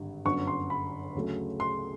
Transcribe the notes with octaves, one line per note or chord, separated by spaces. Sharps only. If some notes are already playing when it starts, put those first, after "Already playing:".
Already playing: G#1 G2 D3 G3
G1 F#2 D3 C#6
C6
B5
D2 C#3 F#3 A3
C6